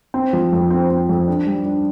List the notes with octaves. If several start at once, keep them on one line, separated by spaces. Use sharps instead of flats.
C4
F3
F2
C4
C4
F2
D4
G3
D4